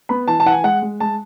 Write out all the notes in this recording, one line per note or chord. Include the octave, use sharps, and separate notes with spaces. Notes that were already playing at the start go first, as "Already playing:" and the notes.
B3 B5
E3 A5
A5
E3 F#5
G#5
G#3 F#5
G#3
G#3 A5